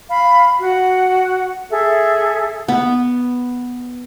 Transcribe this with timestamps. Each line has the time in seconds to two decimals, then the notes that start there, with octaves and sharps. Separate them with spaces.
0.10 F5 B5
0.59 F#4 F#5
1.70 G#4 A4 E5
2.68 B3